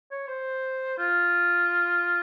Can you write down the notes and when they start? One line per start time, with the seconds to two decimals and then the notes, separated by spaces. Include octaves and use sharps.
0.11 C#5
0.28 C5
0.98 F4